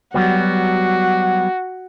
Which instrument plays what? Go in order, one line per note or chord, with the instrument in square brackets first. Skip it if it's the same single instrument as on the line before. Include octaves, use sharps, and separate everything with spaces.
[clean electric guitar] F#3 G3 B3 [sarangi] F#4